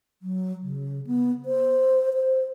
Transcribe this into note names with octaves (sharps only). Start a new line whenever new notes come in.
F#3
C#3
B3
C5
C5